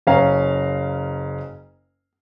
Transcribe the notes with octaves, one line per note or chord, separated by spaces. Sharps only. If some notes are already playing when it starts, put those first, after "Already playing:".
F#1 C#4 F5 A#5